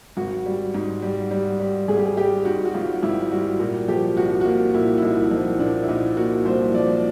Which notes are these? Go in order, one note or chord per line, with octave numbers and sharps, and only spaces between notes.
G#1 F#4
G3
G#2
G3
G3
G3
G#1 G#4
G4
G#4
G3 G4
G#2 F#4
F#4
G#1 F4
G#1 E4
G3 F#4
A#2 F#4
F3 G4
C2 F#4
F#4
A#3 F4
A#2 E4
E4
C2 D#4
F3 D#4
A#2 D4
E4
A#2 D#4
A#3 F#4
C2 C5
F3 D5